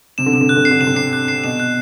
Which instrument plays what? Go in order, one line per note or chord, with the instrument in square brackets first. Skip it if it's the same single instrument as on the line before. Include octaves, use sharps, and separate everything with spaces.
[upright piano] C3 [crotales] E7
[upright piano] D3
[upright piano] C3 [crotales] E7
[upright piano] D3
[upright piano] C3 [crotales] F#6
[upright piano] D3
[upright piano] C3 [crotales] C7
[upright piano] D3
[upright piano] C3 [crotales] E7
[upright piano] D3
[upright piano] C3 [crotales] C7
[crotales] F#6
C7
[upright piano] B2 [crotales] E7
[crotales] F#6